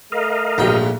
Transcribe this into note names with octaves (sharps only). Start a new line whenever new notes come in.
A3 A#4 D#5 F5
A#1 G#2 F#3 G3 G5